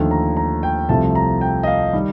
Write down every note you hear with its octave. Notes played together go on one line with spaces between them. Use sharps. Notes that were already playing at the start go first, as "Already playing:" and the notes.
Already playing: D#2 D3 F3 A3
A#5
A#5
G5
C2 C3 F3 A3 A5
A#5
G5
D#5
F5
D#3 G3